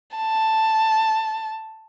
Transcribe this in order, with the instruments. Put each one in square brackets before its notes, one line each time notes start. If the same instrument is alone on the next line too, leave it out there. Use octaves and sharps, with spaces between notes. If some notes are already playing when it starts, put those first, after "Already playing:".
[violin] A5